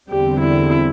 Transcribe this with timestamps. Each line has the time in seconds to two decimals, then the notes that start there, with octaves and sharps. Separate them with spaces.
0.09 E2 D3 G3 C4 G4
0.41 E4